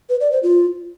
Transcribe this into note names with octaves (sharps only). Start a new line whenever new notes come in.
B4
D5
C5
F4